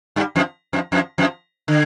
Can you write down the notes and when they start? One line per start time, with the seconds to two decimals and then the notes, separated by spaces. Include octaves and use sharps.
0.16 G2 G3
0.36 F2 F3
0.73 F2 F3
0.92 F2 F3
1.18 F2 F3
1.68 D3